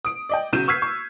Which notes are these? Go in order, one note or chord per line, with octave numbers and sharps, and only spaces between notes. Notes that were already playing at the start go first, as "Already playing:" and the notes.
D#6 D7
D5 D#5 G5
B1 C#3 F#3 G6 D#7 E7
C#6 E6 F6 G#6 B6 C7
C#6